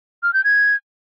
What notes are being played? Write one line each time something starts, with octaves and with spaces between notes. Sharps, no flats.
F6
G6
G#6